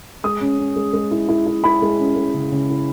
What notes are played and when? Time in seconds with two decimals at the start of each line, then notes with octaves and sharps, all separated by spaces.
0.24 G#3 D#6
0.41 C#4
0.59 C#4
0.76 G#3
0.93 G#3
1.11 E4
1.29 E4
1.46 E4
1.64 E4 B5
1.82 G#3
1.99 C#4
2.16 G#3
2.34 C#3
2.52 C#3
2.70 E4